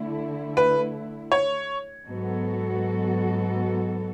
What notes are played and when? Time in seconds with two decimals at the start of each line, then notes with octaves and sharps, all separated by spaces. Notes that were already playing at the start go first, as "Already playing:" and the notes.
Already playing: D3 A3 E4
0.57 B4
1.32 C#5
2.06 G#2 F#3 B3 F#4 A4